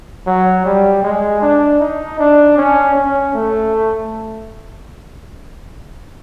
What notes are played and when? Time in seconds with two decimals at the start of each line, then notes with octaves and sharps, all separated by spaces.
0.26 F#3
0.65 G3
1.03 G#3
1.41 D4
1.80 D#4
2.19 D4
2.57 C#4
2.95 C#4
3.34 A3